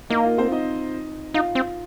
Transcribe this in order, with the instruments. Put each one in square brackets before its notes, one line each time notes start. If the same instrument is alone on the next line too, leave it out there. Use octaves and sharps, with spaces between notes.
[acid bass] A#3 [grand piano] D#4 D#5
[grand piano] F4 F5
C4 C5
D#4 D#5
[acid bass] D#4 [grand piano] F4 F5
[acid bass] C4